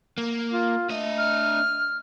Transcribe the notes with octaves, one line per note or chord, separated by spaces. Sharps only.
A#3
F4
A3 D4 D#5
F6